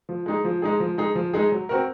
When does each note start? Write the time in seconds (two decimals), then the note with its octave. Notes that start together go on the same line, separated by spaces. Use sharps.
0.09 F3
0.26 G#3 D#4 G#4
0.45 F3
0.62 G#3 D#4 G#4
0.80 F3
0.98 G#3 D#4 G#4
1.15 F3
1.33 G#3 D#4 G#4
1.52 F#3
1.69 C4 F#4 A#4